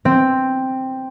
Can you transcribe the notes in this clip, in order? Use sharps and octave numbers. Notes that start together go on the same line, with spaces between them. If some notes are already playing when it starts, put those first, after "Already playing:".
C4